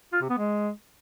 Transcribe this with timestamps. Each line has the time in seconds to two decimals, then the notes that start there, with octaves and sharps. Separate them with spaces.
0.13 F4
0.21 C3
0.30 B3
0.38 G#3